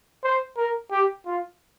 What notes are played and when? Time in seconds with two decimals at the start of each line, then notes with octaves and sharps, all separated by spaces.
0.24 C5
0.57 A#4
0.91 G4
1.26 F4